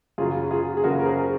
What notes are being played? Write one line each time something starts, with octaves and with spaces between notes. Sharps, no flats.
F#2 C#3 F#3 F4 G#4
F4 G#4
G#4
F#2 C#3 F#3 F#4 A#4
A#4
G#4 C5